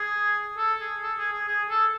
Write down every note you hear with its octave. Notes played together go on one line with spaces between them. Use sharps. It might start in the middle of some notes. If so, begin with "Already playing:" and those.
Already playing: G#4
A4
G#4
A4
G#4
G#4
G#4
A4